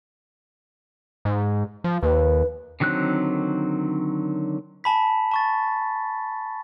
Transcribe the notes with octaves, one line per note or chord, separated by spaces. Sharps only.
G#2
F3
D#2 B4
D3 D#3 F#3 C4 F#6
G#5 A5 B5 B6
A5 C#6 A6